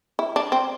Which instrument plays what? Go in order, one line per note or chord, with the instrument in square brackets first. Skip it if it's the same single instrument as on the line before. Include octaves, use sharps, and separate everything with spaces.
[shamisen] E4
D4
C4